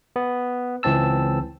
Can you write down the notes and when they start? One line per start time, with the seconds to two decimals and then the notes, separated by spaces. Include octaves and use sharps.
0.16 B3
0.83 C#2 E3 C4 A5 E6